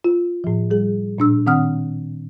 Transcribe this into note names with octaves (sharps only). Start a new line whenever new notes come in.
F4
A2 F3
G3 G#4
A#2 D4 E6
D#3 C4 F#5 D#6 F6